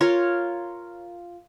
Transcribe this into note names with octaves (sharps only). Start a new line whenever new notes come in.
F4 A#4 C#5